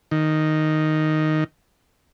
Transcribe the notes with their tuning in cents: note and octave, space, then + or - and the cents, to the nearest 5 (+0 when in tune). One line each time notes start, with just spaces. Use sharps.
D#3 -5